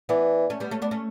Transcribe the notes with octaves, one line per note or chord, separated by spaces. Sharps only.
E3 B3 D4
A3 C#4
G3 B3
A3 C#4
B3 D4
A3 C#4